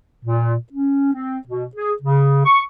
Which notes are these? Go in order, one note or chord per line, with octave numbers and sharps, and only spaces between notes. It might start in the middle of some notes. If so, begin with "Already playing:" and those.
A#2
C#4
C4
B2
G#4
C#3
C#6